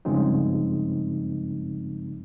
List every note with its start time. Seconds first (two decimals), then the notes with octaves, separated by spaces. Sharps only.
0.05 G2 C#3 F3 G#3 C4 D#4